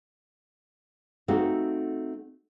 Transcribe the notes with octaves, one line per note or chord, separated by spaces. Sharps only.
A3 C4 D#4 F#4 A4 F5